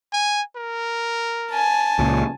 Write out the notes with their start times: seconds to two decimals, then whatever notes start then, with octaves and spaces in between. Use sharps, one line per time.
0.13 G#5
0.56 A#4
1.50 G#5 A5
1.99 C#2 A#2